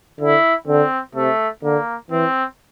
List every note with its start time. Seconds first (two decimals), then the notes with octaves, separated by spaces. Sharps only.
0.20 D3 E4
0.67 D3 C4
1.15 C3 A3
1.63 D3 A#3
2.10 E3 C4